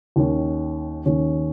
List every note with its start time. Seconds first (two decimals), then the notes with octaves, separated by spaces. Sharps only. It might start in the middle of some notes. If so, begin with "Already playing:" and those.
0.16 D#2 D#3 C#4
1.06 D#2 D#3 C#4